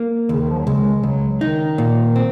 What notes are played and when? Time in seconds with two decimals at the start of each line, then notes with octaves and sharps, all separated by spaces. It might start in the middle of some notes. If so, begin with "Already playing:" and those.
Already playing: A#3
0.29 D#2 C#3
0.41 D#3
0.50 F3
0.58 F#3
0.67 C#2 G#3
1.03 C#2 F#3
1.41 D#3 D#4
1.78 A#2
2.16 C4